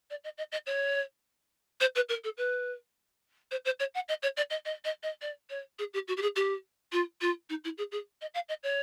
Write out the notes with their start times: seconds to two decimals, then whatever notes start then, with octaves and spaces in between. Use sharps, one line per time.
0.10 D5
0.24 D#5
0.38 D#5
0.52 D#5
0.66 C#5
1.80 C5
1.95 B4
2.09 A#4
2.24 A4
2.37 B4
3.51 C5
3.65 C5
3.80 C#5
3.94 F#5
4.08 D#5
4.22 C#5
4.37 D5
4.50 D#5
4.65 D#5
4.84 D#5
5.03 D#5
5.21 D5
5.50 C#5
5.79 G#4
5.93 G4
6.08 F#4
6.17 G4
6.22 G#4
6.36 G4
6.92 F4
7.21 F4
7.49 D#4
7.64 E4
7.78 G#4
7.91 G#4
8.21 D#5
8.34 F5
8.48 D#5
8.63 C#5